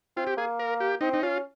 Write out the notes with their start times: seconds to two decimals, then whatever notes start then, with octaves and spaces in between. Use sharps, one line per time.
0.17 C4 F4
0.27 G4
0.37 A#3 G#4
0.59 A#4
0.80 G4
1.01 C4 D#4
1.13 D#4
1.22 C#4 F4